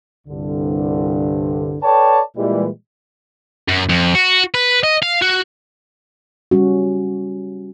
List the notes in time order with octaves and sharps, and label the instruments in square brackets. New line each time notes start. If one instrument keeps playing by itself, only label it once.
[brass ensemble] C2 G2 D3
A4 B4 C#5 D5 G5 A5
A#2 E3 G3 G#3
[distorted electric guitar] F#2
F2
F#4
B4
D#5
F5
F#4
[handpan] G3 C#4 F#4